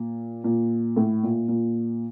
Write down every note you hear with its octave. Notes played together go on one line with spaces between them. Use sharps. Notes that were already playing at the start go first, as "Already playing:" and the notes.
Already playing: A#2
A#2
A2
A#2
A#2